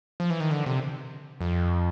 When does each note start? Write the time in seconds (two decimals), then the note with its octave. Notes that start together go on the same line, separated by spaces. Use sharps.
0.20 F3
0.30 E3
0.40 D#3
0.51 D3
0.66 C3
1.41 F2